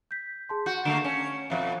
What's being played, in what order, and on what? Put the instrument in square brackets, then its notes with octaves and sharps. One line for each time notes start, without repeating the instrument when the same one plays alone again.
[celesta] G6 B6
G#4 A5 C6
[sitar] F#4 [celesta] G6
[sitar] D3 A3 A#3 [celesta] D7 E7
[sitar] C#4
[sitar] F2 B2 [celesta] E5 F5 F#6